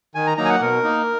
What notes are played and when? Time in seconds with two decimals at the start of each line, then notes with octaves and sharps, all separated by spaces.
0.15 D#3 G#5
0.27 A#5
0.38 F#3 A#3 D#4 A#5
0.45 G#5
0.49 F#5
0.61 B2 A#4
0.84 A#3 D#4